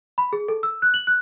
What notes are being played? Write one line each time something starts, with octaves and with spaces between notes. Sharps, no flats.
B5
G#4
A4
E6
F#6
F#7
F#6